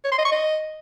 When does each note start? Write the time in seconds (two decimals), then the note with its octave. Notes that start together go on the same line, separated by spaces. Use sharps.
0.05 C#5
0.12 C6
0.18 D#5
0.25 C#6
0.32 D#5